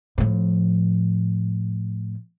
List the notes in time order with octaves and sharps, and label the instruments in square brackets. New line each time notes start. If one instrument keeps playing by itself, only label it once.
[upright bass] A2 F3